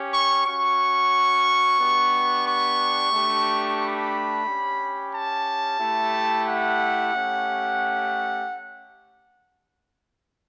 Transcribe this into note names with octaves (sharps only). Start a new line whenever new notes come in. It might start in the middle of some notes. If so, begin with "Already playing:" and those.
Already playing: C#4 G4
C#6
C#4 F#4 C#6
B3 D4 G4
C#6
A3 D4 G4
B5
C#4 G4
A5
A3 E4 G4
F#5
A3 C#4 G4